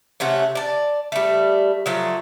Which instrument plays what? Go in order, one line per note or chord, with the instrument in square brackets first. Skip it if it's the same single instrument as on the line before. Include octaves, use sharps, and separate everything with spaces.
[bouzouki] C3 A3 C#4 F#5
D5 A5
G3 A3
F3 F#3 A3